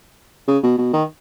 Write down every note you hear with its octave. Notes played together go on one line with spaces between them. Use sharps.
C#3
B2
B2
D#3